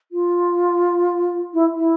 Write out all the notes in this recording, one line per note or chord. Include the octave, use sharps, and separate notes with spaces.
F4
E4
E4